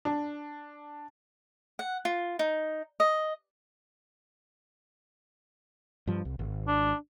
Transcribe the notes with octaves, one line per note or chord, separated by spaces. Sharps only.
D4
F#5
F4
D#4
D#5
G2 F3
C2
G#1
D4